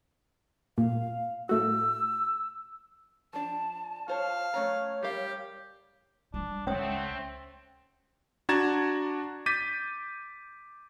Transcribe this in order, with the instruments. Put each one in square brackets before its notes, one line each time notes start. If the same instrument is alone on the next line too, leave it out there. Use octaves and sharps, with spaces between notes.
[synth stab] A#2 [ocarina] F5
[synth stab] A2 A3 F#4 [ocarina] E6
[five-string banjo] F3 D4 [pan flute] A5
[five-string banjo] F4 C5 C#5 [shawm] F5
[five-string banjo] A3 C#4 A#5 [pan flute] C#5
[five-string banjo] G3 A#4 F5 [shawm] G4
[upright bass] G3 [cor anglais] D4
[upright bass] C#2 [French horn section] A3 C4 [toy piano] C#4 C#5 D#6 [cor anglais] F#5
[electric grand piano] D4 F#4 A#5 G#6 A6 E7
D6 G6 A6 B6 D#7